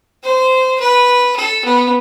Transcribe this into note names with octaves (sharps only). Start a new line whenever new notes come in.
C5
B4
A4
B3